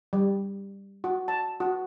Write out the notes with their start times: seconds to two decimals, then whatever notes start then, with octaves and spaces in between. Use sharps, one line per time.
0.13 G3
1.04 F#4
1.28 A5
1.60 F#4